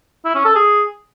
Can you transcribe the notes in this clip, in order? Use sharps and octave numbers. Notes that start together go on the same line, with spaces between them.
E4
C#4
A4
G#4